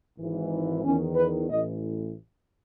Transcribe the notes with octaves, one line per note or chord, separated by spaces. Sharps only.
G#1 G#2 E3
E2 D#3 C#4
B4
A1 A2 E3 D#5